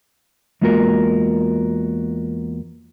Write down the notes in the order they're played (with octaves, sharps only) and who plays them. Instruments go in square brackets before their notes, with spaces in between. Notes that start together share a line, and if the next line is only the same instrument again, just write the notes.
[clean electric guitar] E2 G#3 A#3 F4 F#4 A#4